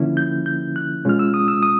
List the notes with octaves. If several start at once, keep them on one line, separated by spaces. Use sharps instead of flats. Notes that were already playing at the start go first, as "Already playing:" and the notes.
Already playing: D3 F3 A#3 C#4 E4
G6
G6
F#6
B2 G#3 C#4 F4 F6
E6
D#6
E6
D#6